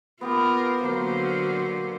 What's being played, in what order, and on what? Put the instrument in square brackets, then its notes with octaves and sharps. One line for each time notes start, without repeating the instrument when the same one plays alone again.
[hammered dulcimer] B3 G4 B4 [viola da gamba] F4 A#4
[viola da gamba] D3 F#3 C5 [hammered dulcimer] A#3 A#4